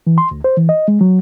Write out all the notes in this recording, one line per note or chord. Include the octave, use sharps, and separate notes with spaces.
E3
C6
D2
C5
E3
D#5
G#3
F#3